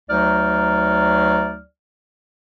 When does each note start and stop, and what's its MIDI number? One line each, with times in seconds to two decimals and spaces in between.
0.09 1.59 38
0.09 1.59 54
0.09 1.59 63
0.09 1.59 74
0.09 1.59 89